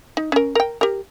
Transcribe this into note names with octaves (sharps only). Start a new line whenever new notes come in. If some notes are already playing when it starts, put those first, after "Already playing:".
D#4
C#4 A#4
A#4 G5
G4 A#4